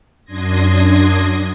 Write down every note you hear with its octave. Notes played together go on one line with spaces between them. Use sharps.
F#2 D4 C6 D#6 G#6 A#6